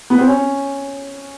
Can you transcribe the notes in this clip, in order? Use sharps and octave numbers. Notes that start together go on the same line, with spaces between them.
B3
C4
C#4